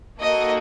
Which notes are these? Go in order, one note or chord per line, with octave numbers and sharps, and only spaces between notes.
A#3 D#4 F#4 A4 D#5